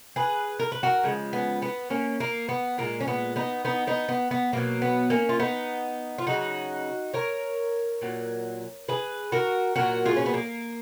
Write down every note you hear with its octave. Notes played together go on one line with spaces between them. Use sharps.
G#4 B4
A#4
B4
F#4 A#4
C#3 F3 G#3
B3
B3
A#3 C#4
A#3
B3
A#2 G#3 A#3
C#4
B3
B3 D#4
B3 D#4
B3 D#4
B3
B3
B2 F#3 A#3
B3
A#3 C#4
F4
B3 D#4
F4
C#3 F#3 D#4 F#4
A#4 C#5
A#2 F#3
G#4 B4
F#4 A#4
A#2 F#3 F#4 A#4
F4 G#4
C#4
B3
A#3